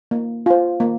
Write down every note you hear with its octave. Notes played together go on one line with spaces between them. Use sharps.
A#3
F4 C5
A#3